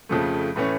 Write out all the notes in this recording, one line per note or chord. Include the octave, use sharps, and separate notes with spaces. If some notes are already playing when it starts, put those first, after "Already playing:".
F2 C#3 F3 A3
A2 E3 A3 C#4